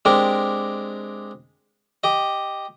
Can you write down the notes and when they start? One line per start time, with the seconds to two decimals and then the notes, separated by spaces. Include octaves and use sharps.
0.05 G#3 C4 D4 G4 A#4
2.04 G4 D#5